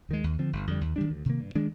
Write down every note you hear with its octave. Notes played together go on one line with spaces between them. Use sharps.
D#2 D#3 G#3
D#2
D3 F3 C4
G1
F2 D3 G3
D#2
D#3 G3 D4
D2
C3 D#3 A#3
G2
D#3 G#3 D4